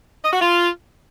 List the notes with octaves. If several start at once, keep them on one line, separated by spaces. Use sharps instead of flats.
D#5
F#4
F4